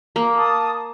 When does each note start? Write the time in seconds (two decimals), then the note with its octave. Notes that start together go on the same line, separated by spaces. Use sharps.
0.16 A#3
0.36 A5 D#6